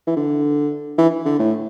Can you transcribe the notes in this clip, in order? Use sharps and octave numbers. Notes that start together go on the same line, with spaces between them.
E3
D3
E3
D3
A2